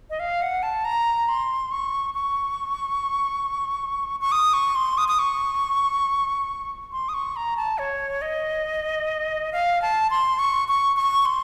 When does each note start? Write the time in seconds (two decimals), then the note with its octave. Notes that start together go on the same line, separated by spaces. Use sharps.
0.10 D#5
0.20 F5
0.42 F#5
0.63 A5
0.85 A#5
1.29 C6
1.71 C#6
2.14 C#6
4.20 C#6
4.32 D#6
4.53 C#6
4.75 C6
4.98 D#6
5.08 D#6
5.19 C#6
6.92 C6
7.09 D#6
7.14 C#6
7.36 A#5
7.57 A5
7.78 C#5
8.22 D#5
9.52 F5
9.82 A5
10.10 C6
10.39 C#6
10.68 C#6
10.96 C#6
11.25 C6